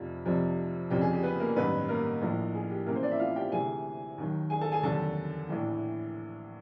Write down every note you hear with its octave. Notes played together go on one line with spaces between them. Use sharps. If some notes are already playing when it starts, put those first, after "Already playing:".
Already playing: F1 F2 C3 F3
F1 F2 C3 F3
F1 F2 C#3 F3 G4
G#4
G4
B3 B4
A#3 A#4
A1 G2 D#3 F#3 B3 B4
A#3 A#4
A#1 A2 F3
G#4
G4
C#2 C#3 E3 A#3 A#4
C4 C5
D4 D5
E4 E5
F4 F5
G4 G5
D2 C3 E3 G#4 G#5
D#2 D#3 F#3
G#4 G#5
A4 A5
G#4 G#5
F1 D#2 D3 F#3 A4 A5
A#1 A2 E3